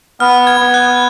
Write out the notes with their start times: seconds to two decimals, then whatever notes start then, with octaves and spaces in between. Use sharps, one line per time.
0.20 B3 F6
0.47 G#6
0.60 B3
0.74 F#6